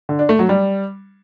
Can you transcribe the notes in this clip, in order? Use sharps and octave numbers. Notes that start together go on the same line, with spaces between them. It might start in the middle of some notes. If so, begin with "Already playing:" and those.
D3
D4
A3
F#3
G3